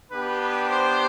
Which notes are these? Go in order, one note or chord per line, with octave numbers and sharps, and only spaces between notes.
B3 D4 G4 B4
B4
C5